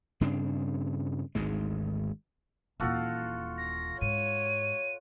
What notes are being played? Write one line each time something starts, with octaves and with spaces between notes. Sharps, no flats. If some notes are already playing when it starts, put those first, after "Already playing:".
G2 C#3 C4 D4
G#1 D2 G#2 G#3
D#1 E3 F4 F#4 A4
A#6
G#2 C#5 D#7